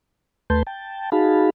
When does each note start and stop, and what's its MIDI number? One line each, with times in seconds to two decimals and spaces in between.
0.50 0.63 39
0.50 0.63 57
0.50 0.63 71
0.50 0.63 81
0.50 0.63 84
0.50 0.63 91
0.67 1.10 79
0.67 1.10 81
1.12 1.50 63
1.12 1.50 66
1.12 1.50 68
1.12 1.50 77
1.12 1.50 81
1.12 1.50 83